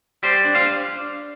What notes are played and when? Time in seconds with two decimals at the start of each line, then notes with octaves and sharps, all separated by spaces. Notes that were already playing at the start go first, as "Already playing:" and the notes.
0.23 G3 G4 C5
0.45 D4
0.55 C5 F5